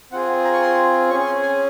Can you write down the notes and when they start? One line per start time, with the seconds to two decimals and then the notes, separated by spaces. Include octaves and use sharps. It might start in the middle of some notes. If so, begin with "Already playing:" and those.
0.12 C4 F4 G#4 F#5
0.45 A#5
0.53 C#6
0.61 C6
1.09 C#4 C#6
1.13 G#4
1.20 C#6
1.26 C6
1.42 G#5